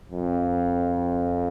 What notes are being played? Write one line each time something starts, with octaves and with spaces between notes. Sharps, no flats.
F2